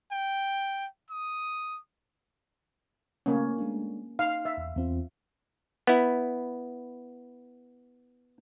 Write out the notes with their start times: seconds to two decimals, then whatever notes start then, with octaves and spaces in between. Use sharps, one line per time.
0.12 G5
1.10 D#6
3.26 C#3 A3 A#3 C#4
3.58 G#3 A3 D4
4.19 D#4 F5
4.45 E5
4.57 E2
4.76 E2 C4 F4
5.87 B3 E4